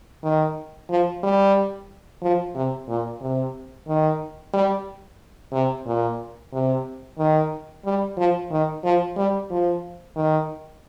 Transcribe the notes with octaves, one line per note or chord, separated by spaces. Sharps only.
D#3
F3
G3
F3
C3
A#2
C3
D#3
G3
C3
A#2
C3
D#3
G3
F3
D#3
F3
G3
F3
D#3